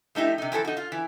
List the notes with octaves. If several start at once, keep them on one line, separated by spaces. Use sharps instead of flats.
F3 A3 D#4 E4 G4
C3 D#4
E3 F3 G#4 A4
D#4 F#4
F4
E3